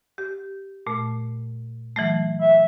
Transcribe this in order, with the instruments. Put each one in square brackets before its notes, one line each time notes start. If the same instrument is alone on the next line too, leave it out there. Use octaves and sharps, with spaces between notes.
[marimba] G4
A#2 A3
E3 F#3 A3
[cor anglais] E5